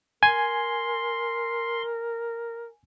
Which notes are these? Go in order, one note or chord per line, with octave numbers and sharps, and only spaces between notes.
A#4 G#5 C6